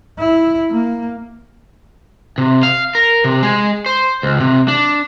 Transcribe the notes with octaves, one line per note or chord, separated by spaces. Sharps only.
E4
A#3
C3
F5
A#4
C3
G#3
C5
C#2
C3
D4